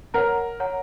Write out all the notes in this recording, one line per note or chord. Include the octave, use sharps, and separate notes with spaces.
A#4 C#5 F#5 A#5
C#5 F#5 A#5